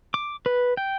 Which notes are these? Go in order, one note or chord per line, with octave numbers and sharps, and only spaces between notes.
D6
B4
G5